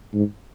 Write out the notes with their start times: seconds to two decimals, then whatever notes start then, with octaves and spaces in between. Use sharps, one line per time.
0.14 G#2